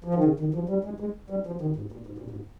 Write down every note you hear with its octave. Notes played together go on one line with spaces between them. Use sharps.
F3
D#3
C#3
D#3
F3
G3
G#3
G#3
G3
F3
D#3
G#2
A#2
G#2
A#2
G#2